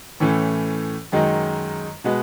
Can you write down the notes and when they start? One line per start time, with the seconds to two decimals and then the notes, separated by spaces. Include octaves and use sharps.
0.20 A2 E3 A3 C#4
1.12 F#2 D#3 G#3 D#4
2.04 B2 G#3 B3